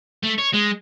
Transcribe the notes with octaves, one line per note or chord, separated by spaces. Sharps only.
A3
C#5
G#3